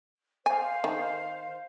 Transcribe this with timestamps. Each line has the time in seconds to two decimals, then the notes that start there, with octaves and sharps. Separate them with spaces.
0.46 C5 F5 G#5
0.84 D#3